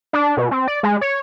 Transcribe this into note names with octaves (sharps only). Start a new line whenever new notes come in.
D4
B2
C4
D5
G#3
C#5